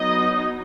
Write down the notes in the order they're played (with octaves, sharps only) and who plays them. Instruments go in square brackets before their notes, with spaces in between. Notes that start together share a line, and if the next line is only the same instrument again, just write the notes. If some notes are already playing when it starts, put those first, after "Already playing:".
Already playing: [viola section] F#3 B3 D#4 D#5